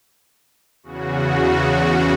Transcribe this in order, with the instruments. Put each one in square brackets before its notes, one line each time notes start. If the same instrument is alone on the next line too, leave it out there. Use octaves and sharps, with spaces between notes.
[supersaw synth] E2 C#3 F#4